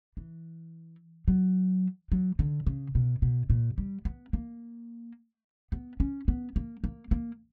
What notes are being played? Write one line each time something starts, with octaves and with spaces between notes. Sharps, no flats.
E3
F#3
F#3
D3
C#3
B2
B2
A#2
G3
B3
A#3
B3
C#4
B3
A#3
A#3
A#3